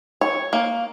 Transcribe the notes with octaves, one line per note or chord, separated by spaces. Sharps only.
C#5
A#3